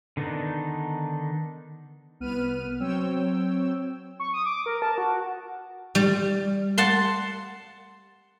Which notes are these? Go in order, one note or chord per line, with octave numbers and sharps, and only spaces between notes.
D3 D#3 B3 D4 D#4
C2 B3 B4 F6 D#7
F#3 C4 C#5 G5 E6
C#6
D#6
D6
A#4
A5
F#4
G3
F#5 A5 C6